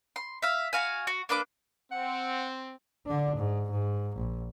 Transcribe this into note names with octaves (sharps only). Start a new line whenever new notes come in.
C6
E5 F5
F#4 F5 G#5
F#4
A#3 D4 B4 D6
C4 F#5
D3 D4
G#2
G#2
A#1